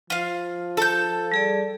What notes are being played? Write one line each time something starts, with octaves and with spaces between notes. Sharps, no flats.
F3 F4 F5
A4 A5 G6
G3 G#4 D5